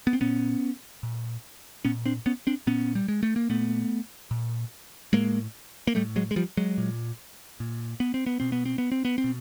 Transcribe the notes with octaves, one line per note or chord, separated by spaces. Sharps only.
B3
C4
A#2 B3 C#4
A#2
A#2 B3 C#4
C4 D4
B3 C#4
C4 D4
A#2 B3 C#4
G3
G#3
A3
A#3
A#2 A3 B3
A#2
A2 G#3 A#3
A#3
A2 G3 A3
F#3 G#3
G#3
F3 G3
F#3 G#3
A#2
A#2
B3
C4
B3
B2 C4
B3
C4
B3
C4
B3
C4
B2